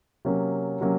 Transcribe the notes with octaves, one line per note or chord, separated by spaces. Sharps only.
C3 F#3 A#3 C#4
C3 F#3 A#3 C#4